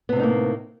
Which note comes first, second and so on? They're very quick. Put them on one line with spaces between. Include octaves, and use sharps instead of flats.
B3 C3 A2 D#4 A#3